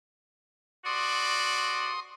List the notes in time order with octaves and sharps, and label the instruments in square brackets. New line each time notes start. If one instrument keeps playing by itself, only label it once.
[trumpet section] F#4 D5 [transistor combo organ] C6 D#6